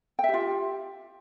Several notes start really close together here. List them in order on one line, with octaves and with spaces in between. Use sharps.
G5 E5 G4 F4